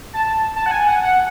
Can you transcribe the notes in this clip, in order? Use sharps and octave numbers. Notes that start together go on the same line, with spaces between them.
A5
A5
F#5
G#5
F#5
F#5